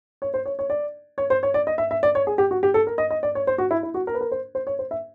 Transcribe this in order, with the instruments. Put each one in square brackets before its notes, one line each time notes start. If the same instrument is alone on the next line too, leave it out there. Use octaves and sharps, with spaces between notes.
[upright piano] C#5
C5
C#5
C#5
D5
C#5
C5
C#5
D5
D#5
E5
E5
D5
C#5
G#4
G4
F#4
G4
A4
A#4
D#5
D#5
D5
C#5
C5
F#4
E4
E4
F#4
A#4
B4
A#4
C5
C5
C#5
C5
E5